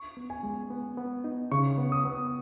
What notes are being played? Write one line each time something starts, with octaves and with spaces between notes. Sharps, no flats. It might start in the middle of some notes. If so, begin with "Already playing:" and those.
Already playing: C#6
B3
G#5
G#3
B3
B3
D#4
C#3 C#6
B3
D#6
B3